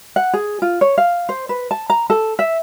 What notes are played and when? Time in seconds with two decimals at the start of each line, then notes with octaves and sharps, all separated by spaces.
0.16 F#5
0.34 G#4
0.62 F4
0.81 C#5
0.98 F5
1.29 C5
1.49 B4
1.71 A5
1.90 A#5
2.10 A4
2.39 E5